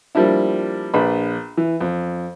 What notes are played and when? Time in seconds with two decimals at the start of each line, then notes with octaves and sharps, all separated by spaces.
0.15 F3 G3 A#3 D4 E4
0.94 A#1 D4 B4 B5
1.57 E3
1.81 F2